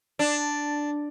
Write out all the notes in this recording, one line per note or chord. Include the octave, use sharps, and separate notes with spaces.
D4